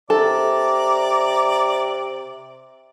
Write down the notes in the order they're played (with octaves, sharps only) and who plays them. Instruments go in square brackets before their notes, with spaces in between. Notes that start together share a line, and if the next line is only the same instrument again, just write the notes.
[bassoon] C3 [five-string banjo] A4 [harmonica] D5 A#5